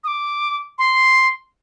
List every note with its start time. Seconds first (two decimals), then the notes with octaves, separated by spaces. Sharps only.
0.04 D#6
0.08 D6
0.79 C6